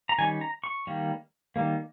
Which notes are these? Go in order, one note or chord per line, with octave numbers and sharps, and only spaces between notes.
A#5
D#3 G3 C#4 G#5
A#5
C#6
D#3 G3 A#3
D#3 G3 A#3